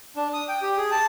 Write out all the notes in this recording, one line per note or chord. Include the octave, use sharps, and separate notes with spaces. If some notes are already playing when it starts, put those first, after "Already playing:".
D4
D#6
G5
G4
G#4
A5